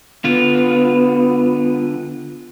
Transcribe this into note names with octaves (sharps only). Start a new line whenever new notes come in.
D3 B3 F4